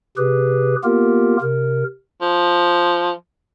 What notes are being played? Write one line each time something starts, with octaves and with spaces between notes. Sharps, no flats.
C3 G4 G#4 B4
A#3 B3 F4 G4 A#4
C3 A#4
F3